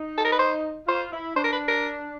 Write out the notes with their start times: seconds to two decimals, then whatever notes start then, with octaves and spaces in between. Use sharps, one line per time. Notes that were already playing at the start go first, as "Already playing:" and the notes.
Already playing: D#4
0.18 A4
0.25 A#4
0.32 B4
0.39 C5
0.88 F4 C5
1.12 E4
1.36 D4 C5
1.44 A#4
1.53 B4
1.68 A#4